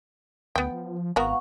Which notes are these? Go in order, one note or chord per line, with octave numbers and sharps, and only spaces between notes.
D2 B3 G5
F3
G#1 B3 F#4 A#4 F5 F#5 C#6